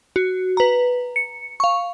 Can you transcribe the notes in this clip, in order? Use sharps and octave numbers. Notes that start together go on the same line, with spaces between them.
F#4
B4 A#5
C#7
F5 C#6